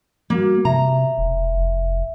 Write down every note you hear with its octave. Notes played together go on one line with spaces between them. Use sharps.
G3 A#3 F#4
C3 E5 A#5
E1
F1